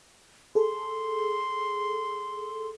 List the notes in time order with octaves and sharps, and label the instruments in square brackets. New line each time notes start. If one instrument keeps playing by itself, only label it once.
[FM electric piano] G#4 A4 [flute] C6